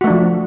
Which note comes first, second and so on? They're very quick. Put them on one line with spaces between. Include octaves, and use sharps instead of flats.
F#4 A3 D4 F3